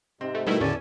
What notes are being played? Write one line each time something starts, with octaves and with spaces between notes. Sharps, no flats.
G#2 C3 G#3 C4
A3
B2 D#3 G3 A3 E4 A4
E2 A2 D3 C#4 D5 G#5 A5